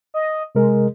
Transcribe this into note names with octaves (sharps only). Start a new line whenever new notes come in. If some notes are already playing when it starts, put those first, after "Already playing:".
D#5
C3 G#3 A#4